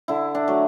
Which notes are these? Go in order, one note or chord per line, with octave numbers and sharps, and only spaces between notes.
D3 E4
D4
F#3 A3